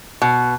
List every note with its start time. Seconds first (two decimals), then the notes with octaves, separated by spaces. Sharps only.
0.22 B2